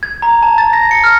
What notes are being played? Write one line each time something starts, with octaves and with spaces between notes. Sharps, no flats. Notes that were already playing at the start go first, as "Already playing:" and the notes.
G#6
A#5
A5
A6
A#6
C#7
F6